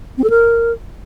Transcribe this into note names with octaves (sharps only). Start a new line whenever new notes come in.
C4
A4
A#4